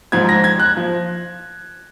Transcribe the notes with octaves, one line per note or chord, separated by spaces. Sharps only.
G#2 F3 G#6
A#6
G#6
F#6
F3